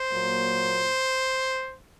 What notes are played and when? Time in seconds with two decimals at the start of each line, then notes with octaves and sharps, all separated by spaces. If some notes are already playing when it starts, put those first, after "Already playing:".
Already playing: C5
0.10 A#2 F#3 A#3